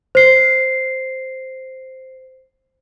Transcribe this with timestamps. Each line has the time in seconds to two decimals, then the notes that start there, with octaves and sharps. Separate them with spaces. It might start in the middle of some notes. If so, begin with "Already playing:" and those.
0.15 C5 C7